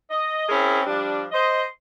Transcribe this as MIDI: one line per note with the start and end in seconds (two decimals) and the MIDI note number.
0.11 0.48 75
0.49 0.81 60
0.49 0.81 61
0.49 0.81 64
0.49 0.81 68
0.49 0.81 70
0.87 1.25 53
0.87 1.25 55
0.87 1.25 62
1.32 1.63 72
1.32 1.63 75